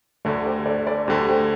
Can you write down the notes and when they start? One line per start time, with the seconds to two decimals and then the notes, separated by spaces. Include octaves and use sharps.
0.25 D2 D3 A3 A4 D5
0.45 G4 C5
0.66 A4 D5
0.87 A4 D5
1.07 D2 D3 A3 G4 C5
1.28 G4 C5